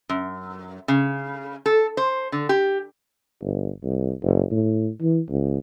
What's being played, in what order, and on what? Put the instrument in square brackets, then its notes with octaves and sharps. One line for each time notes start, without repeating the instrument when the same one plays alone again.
[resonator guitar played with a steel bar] F#2
C#3
A4
C5
D3
G4
[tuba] G1
C2
F#1
A2
E3
C#2